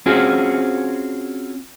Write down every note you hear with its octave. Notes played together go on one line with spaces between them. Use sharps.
C4 C#4 F4 F#4 G#4